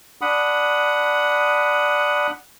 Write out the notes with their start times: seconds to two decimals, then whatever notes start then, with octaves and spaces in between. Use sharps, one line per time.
0.21 D4 F#5 B5 D#6